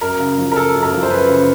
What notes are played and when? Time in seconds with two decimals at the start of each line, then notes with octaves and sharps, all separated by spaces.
0.01 F#2 A#4
0.20 C#3
0.38 F3
0.52 A#4
0.56 C#3 A4
0.74 F#2
0.83 A#4
0.93 F3
1.03 C5
1.10 F#2 B4
1.29 C#3